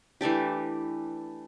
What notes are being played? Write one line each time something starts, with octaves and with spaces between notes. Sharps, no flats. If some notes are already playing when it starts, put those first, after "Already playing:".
E3 A3 D4 G4